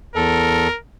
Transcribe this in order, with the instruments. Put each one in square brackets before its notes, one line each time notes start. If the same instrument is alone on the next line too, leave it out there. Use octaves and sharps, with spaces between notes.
[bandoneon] E2 A4 [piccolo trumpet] A#4